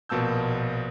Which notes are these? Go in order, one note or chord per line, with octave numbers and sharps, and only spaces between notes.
A#1 B2 A#3 A5 E6 G6